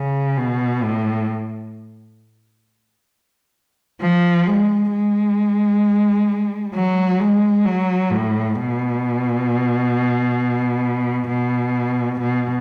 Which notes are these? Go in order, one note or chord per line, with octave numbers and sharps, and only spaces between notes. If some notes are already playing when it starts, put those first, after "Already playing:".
Already playing: C#3
B2
A2
F3
G#3
G#3
F#3
G#3
F#3
A2
B2
B2
B2